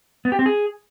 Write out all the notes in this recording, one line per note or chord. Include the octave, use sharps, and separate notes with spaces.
B3
G4
C4
G#4